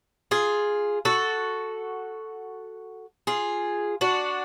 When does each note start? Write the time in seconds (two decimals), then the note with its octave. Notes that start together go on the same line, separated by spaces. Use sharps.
0.31 F4 G#4
1.05 F#4 A4
3.27 F4 G#4
4.01 D4 F#4